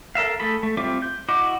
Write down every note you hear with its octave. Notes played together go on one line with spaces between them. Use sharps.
A4 A#4 E5 F5
A3 G#4 A4 B5
A3
G3 C4 F4 E5 D6
G6
E4 F#4 D#5 D6